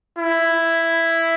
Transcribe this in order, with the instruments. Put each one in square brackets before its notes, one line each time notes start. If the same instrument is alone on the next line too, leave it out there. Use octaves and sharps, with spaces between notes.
[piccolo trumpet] E4